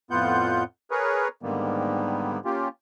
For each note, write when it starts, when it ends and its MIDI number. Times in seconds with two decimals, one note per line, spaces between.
0.11 0.64 41
0.11 0.64 45
0.11 0.64 59
0.11 0.64 65
0.11 0.64 78
0.11 0.64 91
0.91 1.28 68
0.91 1.28 70
0.91 1.28 71
0.91 1.28 73
1.43 2.40 44
1.43 2.40 50
1.43 2.40 51
1.43 2.40 55
1.43 2.40 58
1.43 2.40 59
2.45 2.68 58
2.45 2.68 61
2.45 2.68 65
2.45 2.68 67